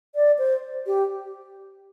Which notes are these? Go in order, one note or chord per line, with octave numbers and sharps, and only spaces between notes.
D5
C5
G4